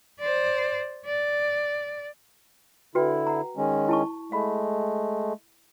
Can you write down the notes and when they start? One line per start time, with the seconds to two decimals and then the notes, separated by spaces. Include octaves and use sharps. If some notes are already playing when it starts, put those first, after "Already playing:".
0.20 C5 D5
1.06 D5
2.95 D3 E4 F#4 B4 G5
3.27 F#5 A#5
3.57 D#3 G#3 C#4
3.89 E4 A5 C#6
4.32 G#3 A3 F5 B5